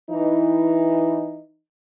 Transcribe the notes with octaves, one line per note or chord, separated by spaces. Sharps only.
E3 D#4